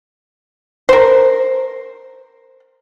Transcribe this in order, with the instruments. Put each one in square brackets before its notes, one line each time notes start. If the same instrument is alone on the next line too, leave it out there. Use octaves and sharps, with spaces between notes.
[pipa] A#4 C5